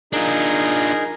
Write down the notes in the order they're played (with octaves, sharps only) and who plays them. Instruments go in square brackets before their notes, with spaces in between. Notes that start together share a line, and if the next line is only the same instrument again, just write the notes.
[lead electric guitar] D4 F4 [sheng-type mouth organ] D#4 G#4 A#4